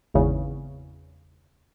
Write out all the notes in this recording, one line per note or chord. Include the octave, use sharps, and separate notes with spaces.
G#1 E2 C#3